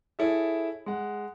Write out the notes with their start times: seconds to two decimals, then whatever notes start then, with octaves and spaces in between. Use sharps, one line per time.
0.19 E4 G#4 A4 C#5 E5
0.86 G#3 F#5